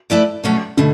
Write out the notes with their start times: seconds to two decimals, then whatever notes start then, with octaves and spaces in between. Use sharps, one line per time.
0.10 A3 E4 B4 D5
0.44 B2 F#3 A3 C#4
0.77 B2 D3 A3